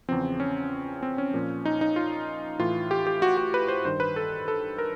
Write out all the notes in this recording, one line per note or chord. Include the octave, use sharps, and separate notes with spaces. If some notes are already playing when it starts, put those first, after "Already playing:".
E2 C#3 F3 C4
C#4
C4
C#4
A#2 F3
D#4
D#4
F4
A2 E3 F4
G4
G4
F#4
F#4
B4
C5
G2 D#3 C5
B4
A4
A4
A#4